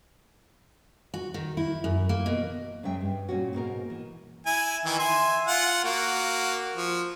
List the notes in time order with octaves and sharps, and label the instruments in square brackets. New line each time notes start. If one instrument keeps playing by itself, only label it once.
[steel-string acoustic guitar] F#4
D#3
E4
F#2
A#3
B2
[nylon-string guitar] F#2 C#3 G#3 E5 G5
G2
A#2 C#4 F#4
G#2 B2 A#3 A#4
E3
[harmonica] E4 G#5
D#3 E3 E4
E5 G#5 C6
F4 F#5
A#3 F#4
F3